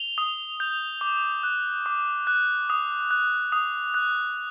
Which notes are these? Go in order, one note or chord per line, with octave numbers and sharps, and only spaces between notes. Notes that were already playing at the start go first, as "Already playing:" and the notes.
Already playing: F7 G7
D#6
G6
D6
F#6
D6
F#6
D#6
F#6
D#6
F#6